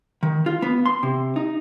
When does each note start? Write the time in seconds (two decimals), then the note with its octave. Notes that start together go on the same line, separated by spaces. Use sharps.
0.23 D#3
0.46 F4
0.62 B3
0.86 C6
1.03 C3
1.36 D#4